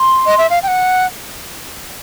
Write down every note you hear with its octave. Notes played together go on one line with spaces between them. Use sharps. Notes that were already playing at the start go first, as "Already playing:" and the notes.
Already playing: C6
D#5
E5
F5
G5
F#5